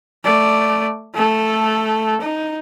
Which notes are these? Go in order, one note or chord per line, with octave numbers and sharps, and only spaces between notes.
A3 D5
A3 A4
D#4